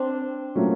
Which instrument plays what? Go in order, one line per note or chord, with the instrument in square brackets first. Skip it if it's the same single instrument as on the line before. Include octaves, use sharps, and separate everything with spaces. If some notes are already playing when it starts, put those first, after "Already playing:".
Already playing: [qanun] C4 D4
[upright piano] A#2 F#3 A3 C#4